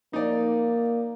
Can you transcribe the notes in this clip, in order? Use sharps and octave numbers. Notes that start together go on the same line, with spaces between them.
A#3 D#4 D5